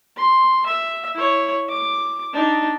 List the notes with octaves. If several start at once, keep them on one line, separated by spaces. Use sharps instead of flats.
C6
E5
E4 C#5
D6
D4 D#4